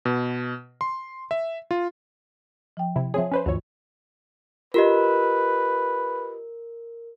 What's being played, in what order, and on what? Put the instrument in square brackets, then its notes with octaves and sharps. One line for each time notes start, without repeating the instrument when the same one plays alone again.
[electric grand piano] B2
C6
E5
F4
[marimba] F3 G5
[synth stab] C3 E4
[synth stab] F3 C4 G#4 [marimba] C#5 E5
[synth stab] C#4 B4 C5
[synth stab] D2 C#5 [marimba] G2 E3 F4
[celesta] F4 G4 D#5 [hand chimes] A#4 [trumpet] B4